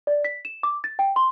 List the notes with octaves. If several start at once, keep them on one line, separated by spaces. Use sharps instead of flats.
D5
B6
E7
D6
A6
G5
C6